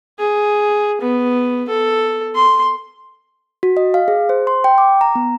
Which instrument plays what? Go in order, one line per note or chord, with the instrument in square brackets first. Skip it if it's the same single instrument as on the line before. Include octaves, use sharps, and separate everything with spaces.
[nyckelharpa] G#4
B3
A4
C6
[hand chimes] F#4
D#5
F5
G#4
C5
C6
G5
D6
A#5
B3